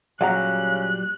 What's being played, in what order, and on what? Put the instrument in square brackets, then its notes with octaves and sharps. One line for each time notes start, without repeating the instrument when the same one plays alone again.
[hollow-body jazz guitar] A#2 F#3 G3 [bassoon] C#3 [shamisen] G#4 F#5 A#5 [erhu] F#6